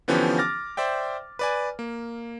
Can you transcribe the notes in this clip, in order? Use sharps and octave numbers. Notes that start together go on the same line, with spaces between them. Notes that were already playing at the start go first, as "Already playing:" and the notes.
D3 E3 F3 B3 C#4 G4
D6 F6 A6 A#6
C5 D5 E5 G5
B4 D5 G#5
A#3